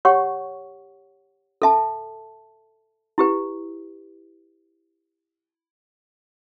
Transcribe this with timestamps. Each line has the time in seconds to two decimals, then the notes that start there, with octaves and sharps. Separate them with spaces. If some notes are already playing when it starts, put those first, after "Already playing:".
0.05 G4 C#5 F#5 C#6
1.62 A4 E5 A5
3.18 E4 G4 B4